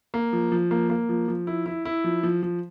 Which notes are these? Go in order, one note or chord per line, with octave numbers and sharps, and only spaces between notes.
A#3
F3
F3
A#3
A#3
F3
F3
E4
E4
E4
F3
F3
F3